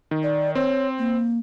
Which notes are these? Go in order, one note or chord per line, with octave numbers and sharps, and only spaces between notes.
D#3
D5
C4 C#5
A#3